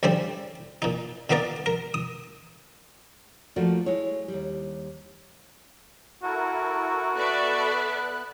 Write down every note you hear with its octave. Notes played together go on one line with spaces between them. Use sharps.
D2 C#3 G3 C4 C5
A#2 D#4
A#2 A#3 B3 D#4 A#4 D5
A#4
D#6
F3 A3 A#3 F#4 A#4 D5
G#3 E4 C#5
D#2 G3
E4 F#4 A4 A#4
B3 A4 B4 D5 E5 F#6